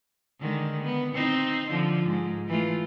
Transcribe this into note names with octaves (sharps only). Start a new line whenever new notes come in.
D3 D#3 G#3
B3
C4 D#4 C5
D3 F3
G#2
E3 A3 F4